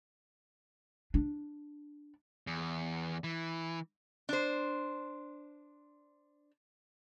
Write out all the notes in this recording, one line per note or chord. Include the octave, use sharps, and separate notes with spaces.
D4
E2
E3
D4 C5